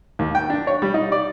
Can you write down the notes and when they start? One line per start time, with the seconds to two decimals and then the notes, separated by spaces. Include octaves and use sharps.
0.19 D#2
0.35 G5
0.50 D4
0.67 C#5
0.82 G3
0.94 D#4
1.12 D5